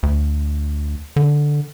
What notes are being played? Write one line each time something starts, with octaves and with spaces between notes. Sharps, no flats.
D2
D3